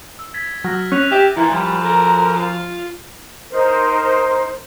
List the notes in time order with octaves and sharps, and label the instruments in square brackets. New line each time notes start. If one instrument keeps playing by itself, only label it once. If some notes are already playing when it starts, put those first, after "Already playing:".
[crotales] E6
G#6 A6 B6
[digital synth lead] F#3 [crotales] F6 A#6
[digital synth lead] C#4 [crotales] F#6 D#7 F7
[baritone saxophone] G4 [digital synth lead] E5
[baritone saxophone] A#2 [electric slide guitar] E3 [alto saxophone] E4
[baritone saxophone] F#2 [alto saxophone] F3 [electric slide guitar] G3
[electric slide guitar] A4 A#4
F4
[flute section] D#4 A#4 C5